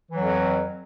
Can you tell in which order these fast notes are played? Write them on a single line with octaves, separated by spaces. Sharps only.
E3 F#3 F2